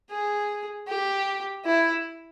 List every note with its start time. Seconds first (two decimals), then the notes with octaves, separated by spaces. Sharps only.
0.10 G#4
0.88 G4
1.65 E4